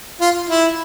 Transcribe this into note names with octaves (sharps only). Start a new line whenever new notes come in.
F4
E4